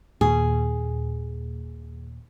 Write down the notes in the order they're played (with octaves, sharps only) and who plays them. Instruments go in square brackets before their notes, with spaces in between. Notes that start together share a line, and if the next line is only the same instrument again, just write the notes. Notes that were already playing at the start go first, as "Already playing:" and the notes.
[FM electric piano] D#2 A#2 [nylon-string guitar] G#4